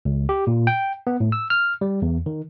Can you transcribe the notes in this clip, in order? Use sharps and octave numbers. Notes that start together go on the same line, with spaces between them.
C#2
G4
A#2
G5
B3
A2
E6
F6
G3
E2
D#3